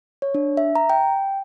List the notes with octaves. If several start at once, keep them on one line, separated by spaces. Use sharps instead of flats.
C#5
D4
E5
A#5
G5